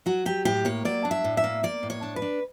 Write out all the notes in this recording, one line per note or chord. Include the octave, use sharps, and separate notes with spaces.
F#3 F#4
F#3 G4
A2 G4
A#3 C#5
F#3 D5
D4
E5
A2
E5
A#3
A#3 D5
A2
C#5
D4
B4
D4